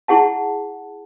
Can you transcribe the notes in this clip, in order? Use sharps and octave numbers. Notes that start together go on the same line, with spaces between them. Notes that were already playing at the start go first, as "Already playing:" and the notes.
E4 G#4 F#5 A5